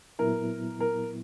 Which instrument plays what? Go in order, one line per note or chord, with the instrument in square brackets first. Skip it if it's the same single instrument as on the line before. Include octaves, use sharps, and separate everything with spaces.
[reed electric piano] A#2 F#3 B3 E4 [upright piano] A#4
[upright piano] A#4